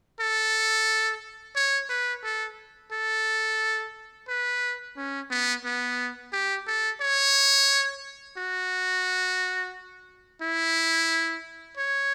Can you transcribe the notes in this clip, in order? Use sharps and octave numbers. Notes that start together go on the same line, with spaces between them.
A4
C#5
B4
A4
A4
B4
C#4
B3
B3
G4
A4
C#5
F#4
E4
C#5